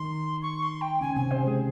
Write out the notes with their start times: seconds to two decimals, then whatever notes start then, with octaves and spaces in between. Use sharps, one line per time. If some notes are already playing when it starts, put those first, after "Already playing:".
Already playing: D#3 D#4 C6
0.42 C#6
0.62 C6
0.81 G5
1.01 C#3 C#4 G#5
1.16 C3 C4 G#5
1.31 C#3 C5
1.46 G#3 G#4